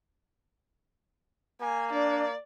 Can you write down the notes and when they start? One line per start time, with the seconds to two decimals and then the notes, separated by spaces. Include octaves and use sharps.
1.60 A#3 G#5
1.92 D4 D5